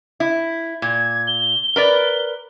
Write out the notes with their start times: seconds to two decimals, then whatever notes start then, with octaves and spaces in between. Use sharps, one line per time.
0.20 E4
0.82 A#2 G#6
1.27 G7
1.76 A#4 B4 D5